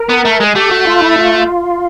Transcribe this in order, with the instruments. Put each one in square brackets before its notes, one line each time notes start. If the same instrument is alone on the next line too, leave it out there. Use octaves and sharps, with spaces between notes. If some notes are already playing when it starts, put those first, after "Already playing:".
Already playing: [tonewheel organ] A#4
[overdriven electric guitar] B3
A3
G#3
[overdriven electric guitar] A3 [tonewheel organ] G4
[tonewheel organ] F#4
F4
E4
F4